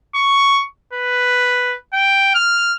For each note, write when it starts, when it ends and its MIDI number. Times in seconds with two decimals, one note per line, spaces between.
0.15 0.63 85
0.93 1.76 71
1.93 2.34 79
2.35 2.76 89